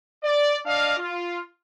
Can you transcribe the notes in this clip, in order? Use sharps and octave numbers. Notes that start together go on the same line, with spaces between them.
D5
D4 D5 D#5 F5
F4